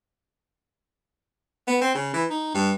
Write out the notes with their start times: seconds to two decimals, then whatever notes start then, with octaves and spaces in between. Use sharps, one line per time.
1.67 B3
1.81 C4
1.95 C#3
2.14 E3
2.30 D#4
2.54 G2